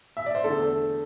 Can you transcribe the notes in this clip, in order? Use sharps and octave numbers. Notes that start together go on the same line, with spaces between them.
E5
D5
C5
E2 D3 A3 A4